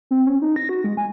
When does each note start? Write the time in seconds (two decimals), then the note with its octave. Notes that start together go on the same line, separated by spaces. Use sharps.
0.11 C4
0.27 C#4
0.42 D#4
0.56 A#6
0.69 F#4
0.84 G#3
0.97 G#5